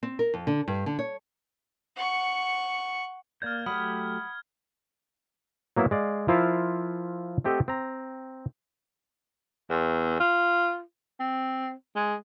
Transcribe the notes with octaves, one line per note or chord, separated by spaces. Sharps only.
C4
A#4
F2
D3
G2
D3
C#5
F#5 C#6
A#3 D5 F6 G6 G#6
F#3 A3 G4 F#5 B5 D#6
F#3 A#3 B3 E4
G#3 D5 F5
F3 E4 F4 A#4 E5 F5
A3 C4 G4 A4 D#5 F#5
C4 A#5
E2
F4
C4
G#3